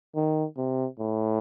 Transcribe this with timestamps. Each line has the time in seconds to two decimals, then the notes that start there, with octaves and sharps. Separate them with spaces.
0.15 D#3
0.57 C3
1.00 A2